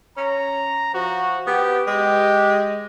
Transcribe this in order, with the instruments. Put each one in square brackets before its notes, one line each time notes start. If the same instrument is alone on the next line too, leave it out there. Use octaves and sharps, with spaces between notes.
[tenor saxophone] C#4 [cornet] A#5
[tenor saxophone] F3 [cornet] F#4
[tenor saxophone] B3 [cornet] G4
[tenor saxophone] G#3 [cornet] G4